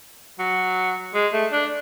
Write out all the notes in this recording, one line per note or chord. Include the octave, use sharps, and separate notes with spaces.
F#3
G#3
A3
D4